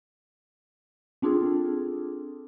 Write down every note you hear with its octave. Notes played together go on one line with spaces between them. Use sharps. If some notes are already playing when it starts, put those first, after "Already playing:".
C4 D4 F4 G#4 A4